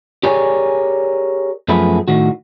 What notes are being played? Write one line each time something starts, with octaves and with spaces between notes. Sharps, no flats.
G4 G#4 A#4 C#5 D5 G#5
F#2 F3 A3 B3 G#4 B5
A2 D#3 F#4